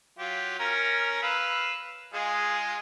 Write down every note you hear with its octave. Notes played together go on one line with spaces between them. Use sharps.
F#3 F4 G4
C#4 A#4 A#5
B4 F5 E6
G#3 F4 G#4